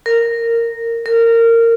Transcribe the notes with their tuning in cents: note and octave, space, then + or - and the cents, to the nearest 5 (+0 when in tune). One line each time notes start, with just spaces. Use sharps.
A#4 -10
A#4 -20